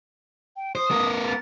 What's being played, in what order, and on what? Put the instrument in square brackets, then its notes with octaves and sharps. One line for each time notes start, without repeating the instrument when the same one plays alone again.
[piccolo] G5
[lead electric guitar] C5 [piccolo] D#6
[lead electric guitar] B3 A#4
[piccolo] A6